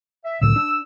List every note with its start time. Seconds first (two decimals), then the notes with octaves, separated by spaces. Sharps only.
0.25 E5
0.41 C2 A2 D3 E6
0.56 D4